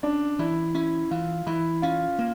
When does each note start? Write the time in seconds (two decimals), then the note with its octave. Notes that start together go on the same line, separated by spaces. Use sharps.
0.03 C#4 D4
0.39 E3 E4
0.75 C#4 E4
1.11 E3 F4
1.47 E3 E4
1.82 C#4 F4
2.19 A#3